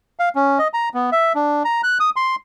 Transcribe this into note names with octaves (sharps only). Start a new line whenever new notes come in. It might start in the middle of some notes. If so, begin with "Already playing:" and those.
F5
C#4
D#5
A#5
B3
E5
D4
A#5
F#6
D#6
C6